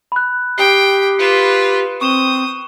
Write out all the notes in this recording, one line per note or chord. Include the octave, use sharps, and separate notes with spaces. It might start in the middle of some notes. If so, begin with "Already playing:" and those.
B5 F#6
G4 G5 D#6 C7
F4 B4 C#7 D#7 E7
C4 C#6 D#6 E7 G7